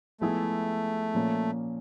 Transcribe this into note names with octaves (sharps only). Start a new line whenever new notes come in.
F3 G#3 A3 B3 E4 G#4
A#2 F3 A#3 C#4